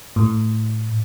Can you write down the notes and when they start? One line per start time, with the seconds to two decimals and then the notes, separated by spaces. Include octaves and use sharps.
0.16 A2